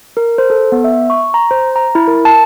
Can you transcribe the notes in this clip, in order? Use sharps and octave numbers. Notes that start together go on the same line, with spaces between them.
A#4
C5
A4
B3
E5
C#6
A#5
C5
A#5
E4
A#4
A5